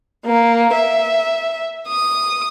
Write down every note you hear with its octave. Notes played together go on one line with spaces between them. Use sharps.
A#3
E5
D#6